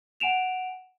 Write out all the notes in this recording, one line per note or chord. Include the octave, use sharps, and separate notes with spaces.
F#5 G#5 D7 E7 F7